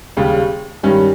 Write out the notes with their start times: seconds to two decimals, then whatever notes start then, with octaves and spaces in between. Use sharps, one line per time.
0.17 D#2 C#3 G3
0.83 G2 D#3 G3 C#4